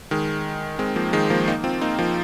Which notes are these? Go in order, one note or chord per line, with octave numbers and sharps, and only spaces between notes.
D#3 G#3
G#3 C4
F3 A#3
D#3 G#3
F3 A#3
A#3 D#4
C4 F4
A#3 D#4
F3 A#3